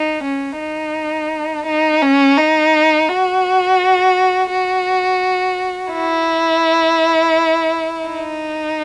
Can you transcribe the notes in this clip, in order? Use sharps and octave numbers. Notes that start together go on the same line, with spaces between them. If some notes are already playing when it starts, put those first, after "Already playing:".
Already playing: D#4
C#4
D#4
D#4
C#4
D#4
F#4
F#4
E4
D#4